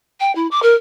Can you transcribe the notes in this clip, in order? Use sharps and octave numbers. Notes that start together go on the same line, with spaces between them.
G5
E4
D6
A#4